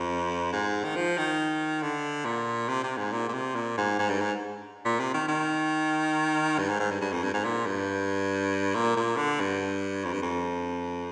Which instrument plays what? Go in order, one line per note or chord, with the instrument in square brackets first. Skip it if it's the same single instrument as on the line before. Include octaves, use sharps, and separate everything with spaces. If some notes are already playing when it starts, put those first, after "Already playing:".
Already playing: [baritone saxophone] F2
G#2
D#3
F3
D#3
D3
A#2
C3
C3
G#2
A#2
A#2
C3
A#2
G#2
G#2
G2
G#2
A#2
C3
D#3
D#3
G2
G#2
G#2
G2
G2
F2
G2
G#2
A#2
G2
A#2
A#2
D3
G2
F2
G2
F2